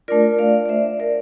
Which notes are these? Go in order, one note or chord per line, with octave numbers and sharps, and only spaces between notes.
A3 D4 F4 A#4 D5
D5 F5
D5
C5 E5
A#4 D5